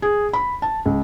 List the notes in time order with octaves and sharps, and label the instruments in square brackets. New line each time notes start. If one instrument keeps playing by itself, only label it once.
[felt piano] G#4
B5
A5
C#2